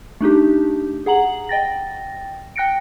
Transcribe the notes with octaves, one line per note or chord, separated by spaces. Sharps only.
A3 D4 D#4 G4
G#4 F#5 A#5 F#7
D#5 G5 A6 A#6
G5 F#6 A#6 C#7 D7